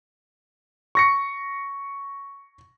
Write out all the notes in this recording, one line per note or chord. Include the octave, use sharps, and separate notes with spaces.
C#6 A#6 C#7